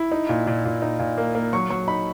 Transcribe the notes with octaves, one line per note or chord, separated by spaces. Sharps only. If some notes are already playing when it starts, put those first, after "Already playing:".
Already playing: E4
D#4
A#2
A#2
A#2
D#4
A#2
A#3
A#3
F#3 C#6
F#3 C#6
D#4 B5